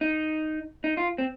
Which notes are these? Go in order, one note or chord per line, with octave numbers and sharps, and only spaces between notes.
D#4
D#4
F4
C4